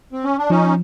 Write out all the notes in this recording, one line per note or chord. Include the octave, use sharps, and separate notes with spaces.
C4
C#4
D4
F3 C#4 D#4